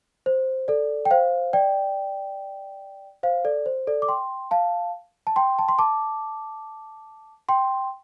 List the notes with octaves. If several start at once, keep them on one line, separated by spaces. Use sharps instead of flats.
C5
A4 D5
G5
C5 F5
D5 G5
C5 F5
A4 D5
C5
A4 D5
D6
G5 C6
F5 A5
A5
G5 C6
A5
C6
A5 D6
G5 C6